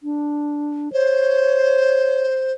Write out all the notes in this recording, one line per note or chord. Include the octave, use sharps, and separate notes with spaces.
D4
C5 C#5